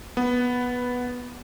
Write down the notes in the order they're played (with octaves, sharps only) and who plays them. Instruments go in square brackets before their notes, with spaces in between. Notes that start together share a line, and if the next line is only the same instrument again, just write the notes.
[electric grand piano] B3